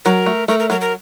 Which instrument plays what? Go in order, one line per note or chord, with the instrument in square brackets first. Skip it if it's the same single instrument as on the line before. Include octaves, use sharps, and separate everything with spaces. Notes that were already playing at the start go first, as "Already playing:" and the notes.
[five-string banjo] F#3 [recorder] A#4
[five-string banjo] A3
[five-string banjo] A3 [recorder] A#4
[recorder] A#4
[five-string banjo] F#3 [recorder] A#4
[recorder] A#4